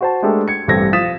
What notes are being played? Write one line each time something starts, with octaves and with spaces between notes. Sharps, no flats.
F#4 C5 A5
G#3 A3 D4 G4 A4 A#4
G#6 C#7
A1 G2 C4 A4 G#6 A#6
F3 F5 D#6 A6 B6 E7